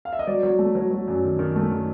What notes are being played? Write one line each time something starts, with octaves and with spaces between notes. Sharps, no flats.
F5
E5
D#5
F#3 D5
F#3
A3
F#3
F#3
F#2
D#3
D#3
A3
D#3